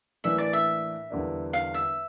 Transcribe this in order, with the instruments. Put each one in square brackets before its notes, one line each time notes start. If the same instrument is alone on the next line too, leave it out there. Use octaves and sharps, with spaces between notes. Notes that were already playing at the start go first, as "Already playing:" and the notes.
[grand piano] A2 E3 A#3 D4 [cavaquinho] E5
[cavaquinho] D5
E5
[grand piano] E2 D3 G3 A#3 D4
[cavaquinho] F5
E5